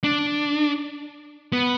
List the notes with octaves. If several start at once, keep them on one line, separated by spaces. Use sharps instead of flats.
D4
B3